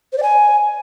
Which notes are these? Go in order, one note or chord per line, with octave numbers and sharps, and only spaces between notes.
C5
D5
G#5